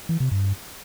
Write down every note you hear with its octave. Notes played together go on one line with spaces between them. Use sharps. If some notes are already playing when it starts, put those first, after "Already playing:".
E3
C3
G2